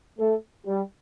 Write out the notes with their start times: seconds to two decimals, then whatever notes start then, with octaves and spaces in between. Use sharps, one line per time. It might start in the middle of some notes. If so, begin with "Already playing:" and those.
0.19 A3 A4
0.66 G3 G4